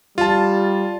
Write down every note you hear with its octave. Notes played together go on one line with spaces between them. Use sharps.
G3 F4 A5